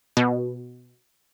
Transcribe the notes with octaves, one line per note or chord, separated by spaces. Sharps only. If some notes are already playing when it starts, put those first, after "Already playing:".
B2